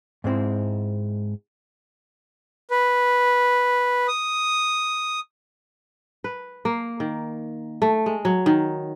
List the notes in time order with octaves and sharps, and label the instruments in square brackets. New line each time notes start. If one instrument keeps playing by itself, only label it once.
[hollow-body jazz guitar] G#2 G#3 C4 E4
[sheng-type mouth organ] B4
D#6
[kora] B4
A#3
D#3
A3
G#3
F#3
D#3